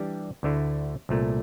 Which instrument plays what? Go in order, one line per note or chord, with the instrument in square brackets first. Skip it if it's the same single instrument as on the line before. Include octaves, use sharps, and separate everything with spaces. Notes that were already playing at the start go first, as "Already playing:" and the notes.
Already playing: [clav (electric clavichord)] E3 G3 D4 G4
D2 D3 A3 E4
C2 A#2 A3